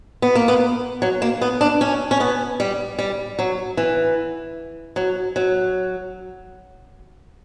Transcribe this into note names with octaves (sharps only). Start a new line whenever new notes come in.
B3
A#3
B3
F#3
A#3
B3
D4
C#4
C#4
B3
G3
G3
F#3
E3
F#3
F#3